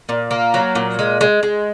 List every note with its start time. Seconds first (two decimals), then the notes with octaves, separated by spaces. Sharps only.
0.09 A#2
0.31 A#3
0.54 F#3
0.75 A#2
0.99 G#3
1.21 G#3
1.43 G#3